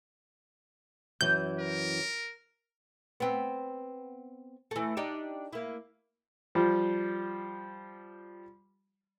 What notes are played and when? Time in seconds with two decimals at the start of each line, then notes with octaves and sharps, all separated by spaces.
1.21 F#2 E3 G6
1.60 A#4
3.20 B3 C4
4.71 E3 A3
4.97 D4 D#4 G4
5.53 A#3 E4
6.55 F3 G3